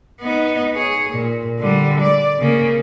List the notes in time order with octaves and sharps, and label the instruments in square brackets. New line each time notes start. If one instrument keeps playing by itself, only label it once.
[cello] B3 D#4
G#4 C#5
A#2
D3 G3
D5
C#3 A#3